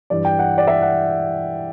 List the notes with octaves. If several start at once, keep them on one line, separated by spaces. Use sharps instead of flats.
G2 E3 D5
G5
F#5
D5
E5
F#5